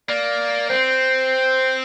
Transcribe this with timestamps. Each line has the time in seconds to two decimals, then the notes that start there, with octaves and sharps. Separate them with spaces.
0.09 A#3 D5
0.70 C4 C5